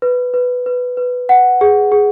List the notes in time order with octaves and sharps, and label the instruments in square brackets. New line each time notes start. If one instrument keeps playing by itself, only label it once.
[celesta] B4
B4
B4
B4
F#5
G#4
G#4